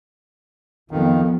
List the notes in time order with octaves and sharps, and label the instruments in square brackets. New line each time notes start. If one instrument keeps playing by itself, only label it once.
[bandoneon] F2 D#3 [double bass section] F3 B3